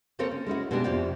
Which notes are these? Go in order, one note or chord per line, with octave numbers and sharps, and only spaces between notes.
C#3 A#3 C4 A4 A#4 C#5
C#4
G#3 C#4 E4 F#4
B2 G#3 B3 D4 G4
F2 C3 F4 G4 D5